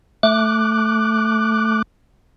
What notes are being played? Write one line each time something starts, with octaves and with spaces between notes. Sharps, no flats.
A3 D6 F#6